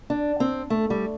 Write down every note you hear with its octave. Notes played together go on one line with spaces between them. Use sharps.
D4
C4
A3
G3